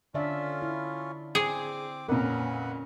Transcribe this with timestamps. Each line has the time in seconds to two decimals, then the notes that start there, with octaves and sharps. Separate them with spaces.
0.14 D3 C#4 D4 F4 E5
0.62 E4
1.35 C4 G#4 D6
2.09 F2 A#2 C#4 A#4 B4 F#5